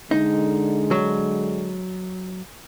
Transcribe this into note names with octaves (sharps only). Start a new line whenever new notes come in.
D3 G#3 D#4
F#3